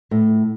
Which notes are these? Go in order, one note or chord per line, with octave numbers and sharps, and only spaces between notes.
A2